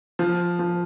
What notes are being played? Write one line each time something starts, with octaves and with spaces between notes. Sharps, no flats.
F3
F3